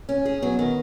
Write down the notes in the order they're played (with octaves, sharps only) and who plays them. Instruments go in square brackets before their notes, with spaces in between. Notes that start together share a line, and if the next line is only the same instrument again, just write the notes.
[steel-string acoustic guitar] C#4
G#4
[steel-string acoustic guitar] F#3 [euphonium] B3
[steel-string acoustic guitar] D#3